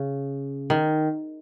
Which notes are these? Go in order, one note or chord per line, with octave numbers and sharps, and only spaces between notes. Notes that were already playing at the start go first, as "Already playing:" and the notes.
Already playing: C#3
D#3